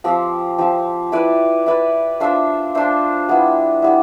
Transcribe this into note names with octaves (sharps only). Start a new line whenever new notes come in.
F3 C4 G4
F3 C4 G4
E4 B4 D5
E4 B4 D5
D4 F4 C5 E5
D4 F4 C5 E5
G3 B3 E4
G3 B3 E4